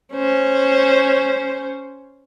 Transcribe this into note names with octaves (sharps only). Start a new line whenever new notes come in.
C#4 C5